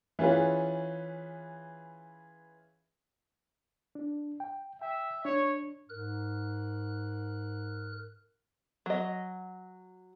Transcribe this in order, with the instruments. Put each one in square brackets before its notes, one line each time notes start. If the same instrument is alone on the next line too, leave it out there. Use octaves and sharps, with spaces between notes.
[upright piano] E3 C#4 F4 G#4 B4
[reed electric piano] D4
G5
[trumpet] E5 [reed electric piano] G5
[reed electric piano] D4 [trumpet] C#5
[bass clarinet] G#2 [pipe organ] A#4 F#6
[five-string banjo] F#3 D#5